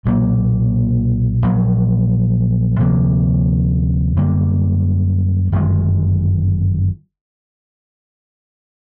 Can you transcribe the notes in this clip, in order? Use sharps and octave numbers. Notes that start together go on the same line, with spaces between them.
B1 A#2 F#3 A#3
A#1 A#2 F#3
D2 C3 F3 A#3
F#2 D3 G3 A#3
G1 F#2 D#3 G#3